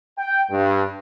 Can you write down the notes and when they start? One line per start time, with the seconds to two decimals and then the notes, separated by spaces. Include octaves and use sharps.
0.18 G5
0.51 G2